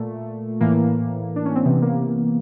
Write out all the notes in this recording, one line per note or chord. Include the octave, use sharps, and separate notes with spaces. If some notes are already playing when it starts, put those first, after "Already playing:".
Already playing: A#2 A3
A2 E3 A#3
D4
C#4
C4
C3 E3 B3
A#3